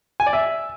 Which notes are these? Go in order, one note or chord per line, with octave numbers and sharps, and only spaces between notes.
G#5
D5
E5